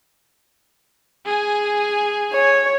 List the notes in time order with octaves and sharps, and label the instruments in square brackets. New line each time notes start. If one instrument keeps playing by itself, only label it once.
[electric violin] G#4 G#5
[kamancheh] C#5